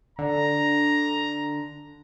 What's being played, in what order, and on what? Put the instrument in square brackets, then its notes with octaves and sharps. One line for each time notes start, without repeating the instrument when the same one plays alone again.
[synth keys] D3 [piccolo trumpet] A#5